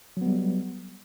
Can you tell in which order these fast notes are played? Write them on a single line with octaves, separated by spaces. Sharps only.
F#3 B3 G3